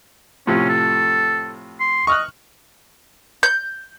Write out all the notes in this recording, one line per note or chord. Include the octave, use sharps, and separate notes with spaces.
A2 C3 F3 C#4
A4
C6
D#5 C#6 F6 F#6
G6